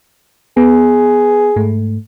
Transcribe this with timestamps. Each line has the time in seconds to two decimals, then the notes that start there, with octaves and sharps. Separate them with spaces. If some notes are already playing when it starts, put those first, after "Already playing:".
0.57 B3 G#4
1.56 G#2 A3